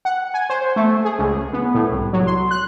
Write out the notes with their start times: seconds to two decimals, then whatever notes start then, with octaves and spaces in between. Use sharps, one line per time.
0.05 F#5
0.34 G#5
0.50 C5
0.76 A3
1.05 G#4
1.19 C#2
1.53 B3
1.75 A2
1.92 C2
2.13 F#3
2.27 C6
2.51 F#6